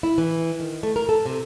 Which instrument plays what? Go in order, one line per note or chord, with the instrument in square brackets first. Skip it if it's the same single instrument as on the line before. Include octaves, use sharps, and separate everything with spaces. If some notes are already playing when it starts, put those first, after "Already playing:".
[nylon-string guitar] E4
E3
D#3
A3
A#4
A4
C3